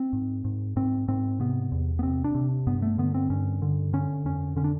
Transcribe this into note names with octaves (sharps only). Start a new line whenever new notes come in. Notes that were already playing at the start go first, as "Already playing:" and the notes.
Already playing: C4
G#2
G#2
G#2 C4
G#2 C4
C3 B3
E2
B3
C3 C4
D4
C3
G2 B3
A3
D3 B3
C4
G2 C#4
D3
D3 C#4
F2 C#4
D3 C#4
D4